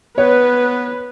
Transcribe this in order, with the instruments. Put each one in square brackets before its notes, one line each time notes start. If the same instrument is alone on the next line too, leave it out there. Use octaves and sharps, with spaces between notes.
[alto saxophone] B3 [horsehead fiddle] B4 [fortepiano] C#5